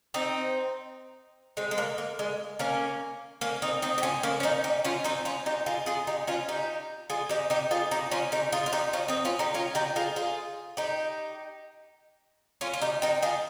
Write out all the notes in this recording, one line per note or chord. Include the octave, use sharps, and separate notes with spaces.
C4 D#4
G#3 C4
G#3
A#3
A#3
G#3
A#3 C#4
A#3 C#4
C4 D#4
C4 D#4
G4
C#4 F4
A#3 C#4
C#4
C4 D#4
D#4 G4
C#4 F4
C4 D#4
C#4 F4
D#4 G4
F4 G#4
F4 G#4
D#4 G4
C#4 F4
D#4 G4
F4 G#4
D#4 G4
D#4 G4
F4 G#4
D#4 G4
C#4 F4
D#4 G4
F4 G#4
F4
D#4 G4
C#4 F4
C4 D#4
C#4 F4
D#4 G4
C#4 F4
D#4 G4
F4 G#4
F4 G#4
D#4 G4
C#4 F4
F4
D#4 G4
D#4 G4
F4 G#4